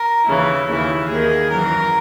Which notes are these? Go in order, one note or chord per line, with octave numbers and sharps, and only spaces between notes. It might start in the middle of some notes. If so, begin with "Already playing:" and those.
Already playing: A#4
D#2 C#3 E3 E4
D#2 C#3 E3 E4
D#2 D#3 G#4
F#2 E3 A#4